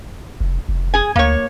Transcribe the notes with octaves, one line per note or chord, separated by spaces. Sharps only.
F1
F1
G#4 G#5
D2 A#3 C#5